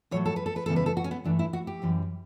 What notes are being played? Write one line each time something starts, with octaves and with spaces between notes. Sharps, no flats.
A2 F#3 A3 C#5
A4
B4
A4
B4
E2 C#3 E3 G3 A4
B4
A4
F#4
C#4
B3
G2 E3 A3 D4
E4
F#4
G4
F#2 E3 G3